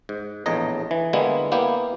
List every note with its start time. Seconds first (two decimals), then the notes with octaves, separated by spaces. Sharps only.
0.09 G#2
0.46 A#1 E2 A2 D#5 A#5
0.91 E3
1.13 D3 G3 G#3 A#3 B3 E4
1.52 A#3 B3 E4 G4